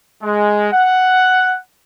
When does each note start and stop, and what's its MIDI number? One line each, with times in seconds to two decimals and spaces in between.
0.23 0.70 56
0.73 1.59 78